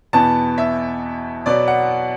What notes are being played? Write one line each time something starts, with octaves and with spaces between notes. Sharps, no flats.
E2 B2 B3 A5
E5
B2 F#3 B3 D5
F#5